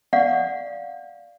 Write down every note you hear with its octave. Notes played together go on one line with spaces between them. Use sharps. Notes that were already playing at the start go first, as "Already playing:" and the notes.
D5 F5 F#5